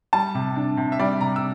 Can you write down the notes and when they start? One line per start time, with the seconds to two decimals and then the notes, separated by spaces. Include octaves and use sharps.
0.13 G3 A5
0.35 C3
0.56 D4
0.77 C3
0.92 E5
0.99 G3 D5
1.21 C3 A#5
1.36 E6